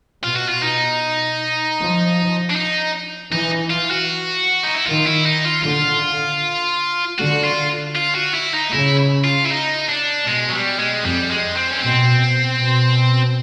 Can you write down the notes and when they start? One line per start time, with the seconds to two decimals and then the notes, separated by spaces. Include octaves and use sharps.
0.24 B2 F4
0.36 F#4
0.49 F4
0.62 D#4
1.78 F3
2.50 D4
2.55 D#4
3.32 E3 D#4
3.71 F4
3.91 F#4
4.64 D#4
4.75 E4
4.87 D#3 F4
5.07 E4
5.26 D#4
5.45 F4
5.64 D3 F4
7.18 D3 F#4
7.44 F4
7.96 F4
8.15 F#4
8.34 E4
8.54 D#4
8.73 C#3 E4
9.24 F4
9.46 E4
9.51 D#4
9.89 D4
10.27 B2 G#3
10.49 F#3
10.53 G3
10.79 G#3
11.04 F2 G3
11.30 G#3
11.56 C4
11.71 C#4
11.82 B2 C4
12.59 B2